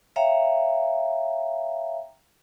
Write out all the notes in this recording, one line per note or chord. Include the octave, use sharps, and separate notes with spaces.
C#5 E5 F5 G5 A#5